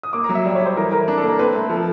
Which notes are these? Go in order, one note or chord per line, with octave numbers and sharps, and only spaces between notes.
D#6
A#3 D6
F#3 A#5
E5
G3 D5
C#5
G3 C5
E3 A#4
E3 A#4
D4 A#4
A4
A#3
A#4
C4 B4
A3
F3 A4